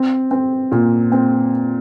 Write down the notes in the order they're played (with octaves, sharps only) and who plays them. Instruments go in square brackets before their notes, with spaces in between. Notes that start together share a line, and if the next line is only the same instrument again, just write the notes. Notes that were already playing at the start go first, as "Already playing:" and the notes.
Already playing: [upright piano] C4
C4
A#2
C4